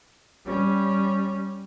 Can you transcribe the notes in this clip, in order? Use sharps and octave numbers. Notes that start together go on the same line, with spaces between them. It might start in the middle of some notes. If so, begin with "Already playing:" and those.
G3 C#4